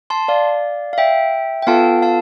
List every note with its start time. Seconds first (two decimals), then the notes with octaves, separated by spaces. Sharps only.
0.10 A5 C6
0.28 D5 F5
0.93 F5
0.98 E5 G5
1.62 G5
1.67 B3 F4 A4 F5 A5
2.02 F5 A5